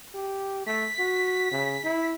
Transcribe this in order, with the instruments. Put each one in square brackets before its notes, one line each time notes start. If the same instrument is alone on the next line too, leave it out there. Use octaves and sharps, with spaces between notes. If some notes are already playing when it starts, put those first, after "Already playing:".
[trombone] G4
[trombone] A3 [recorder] B6
[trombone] F#4
C#3
E4